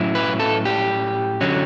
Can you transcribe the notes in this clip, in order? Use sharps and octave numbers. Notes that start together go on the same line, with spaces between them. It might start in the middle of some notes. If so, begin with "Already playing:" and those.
Already playing: A2 F#3 C#4 E4
B4
A4
G4
D3 F#3 C#4